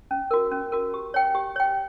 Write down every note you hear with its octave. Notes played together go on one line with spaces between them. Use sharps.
C#4
F#4 A#4
C#4
F#4 A#4
G4
C#5 G5
G4
C#5 G5